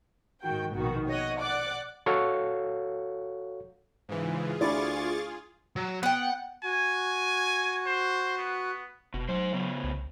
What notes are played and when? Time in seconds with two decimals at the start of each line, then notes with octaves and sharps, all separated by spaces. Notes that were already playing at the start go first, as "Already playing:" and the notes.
0.42 G#2 D#3 F#4 G5
0.76 A#1 B2 D#3 F#4
1.08 C#5 D#5 F#5
1.39 D5 F#5 D6 F#6
2.06 F#4 A4 C#5 F5
4.09 G#2 C#3 E3 F4 G#4
4.61 D2 E4 D5 C#6 D6 A6
5.76 F#3
6.03 B3 F#5 G5
6.64 F#4 G#5
7.86 C5
8.38 B3
9.14 F1 B2
9.29 F#3 D#4 C5
9.53 C#3 B3
9.84 C2